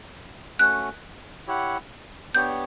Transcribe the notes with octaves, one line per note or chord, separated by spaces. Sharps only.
A3 C#4 F#4 F#6
E4 G4 C#5 F#5
B3 D4 G4 C#5 G6